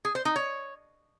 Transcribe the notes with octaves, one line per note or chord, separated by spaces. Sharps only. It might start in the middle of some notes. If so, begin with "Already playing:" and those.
G#4
C5
D#4
C#5